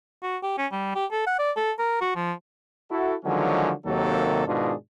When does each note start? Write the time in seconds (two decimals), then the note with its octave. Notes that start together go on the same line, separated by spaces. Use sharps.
0.22 F#4
0.43 G4
0.58 C#4
0.72 G3
0.95 G4
1.11 A4
1.27 F#5
1.39 D5
1.56 A4
1.79 A#4
2.01 F#4
2.16 F3
2.91 E4 F#4 A4
3.25 D3 D#3 F3 F#3 G#3 C#4
3.86 D#2 C3 D#3 F#3 A#3 A4
4.47 G#2 B2 D#3 D4 F4 G#4